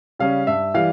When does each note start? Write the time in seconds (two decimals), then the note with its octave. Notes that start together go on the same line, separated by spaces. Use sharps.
0.19 C#3 G3 C#4 F5
0.47 G2 E5
0.74 E3 G3 F5